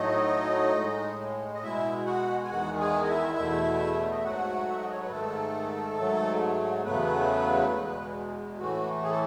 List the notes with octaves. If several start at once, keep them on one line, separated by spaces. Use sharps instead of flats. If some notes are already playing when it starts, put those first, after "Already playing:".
Already playing: A2 F#3 A3 D#4 D#5
A2 G#3
D#5
B2 G#3 E4 E5
F#4 F#5
G#5
E2 D#3 G#3 F#4 F#5
G#4 G#5
D#5
E4 E5
E2 B2 A3
D#5
E5
G#2 F#3 A3 F#4 F#5
E5
D#5
C#5
B4
G#2 D#3 A3 A4
G#2 F#3 A3
E2 C#3 F#3 A3 B3 B4
E2 B2 G#3
A2 E3 A3 F#4
G#4
A4